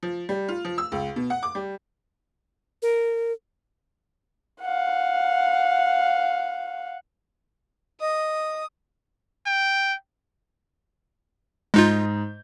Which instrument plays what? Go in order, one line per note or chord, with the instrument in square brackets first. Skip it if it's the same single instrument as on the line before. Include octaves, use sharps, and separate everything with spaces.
[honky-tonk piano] F3
G3
F4
F3
E6
C#2
B2
F#5
D6
G3
[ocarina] A#4
[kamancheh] F5 F#5
[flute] D#5 [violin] D#6
[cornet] G5
[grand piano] G#2 D#5 G6 [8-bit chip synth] G#3 D#4 F4